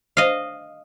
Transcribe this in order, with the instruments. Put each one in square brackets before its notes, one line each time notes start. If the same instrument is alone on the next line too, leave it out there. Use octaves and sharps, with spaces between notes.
[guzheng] D#5 F5